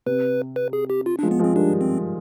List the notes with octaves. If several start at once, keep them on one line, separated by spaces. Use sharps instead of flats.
C3 B4
B4
G#4
G4
F4
D4
F3 G#3
B3
F3 G#3
C4
D#3 G3 D4
C4